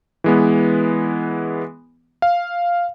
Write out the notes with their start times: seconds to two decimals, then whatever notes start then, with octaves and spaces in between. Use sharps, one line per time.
0.24 E3 G#3 B3
2.22 F5